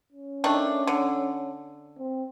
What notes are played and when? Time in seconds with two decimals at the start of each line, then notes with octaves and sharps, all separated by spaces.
0.12 C#4
0.44 D#3 A3 D4
0.87 D3
1.99 C4